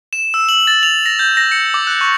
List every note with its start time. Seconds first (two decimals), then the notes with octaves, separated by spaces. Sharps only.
0.13 E7
0.34 E6
0.49 F#7
0.67 A6
0.83 F7
1.06 A#6
1.19 G6
1.37 A#6
1.52 C#7
1.74 D6
1.87 F#6
2.01 C#6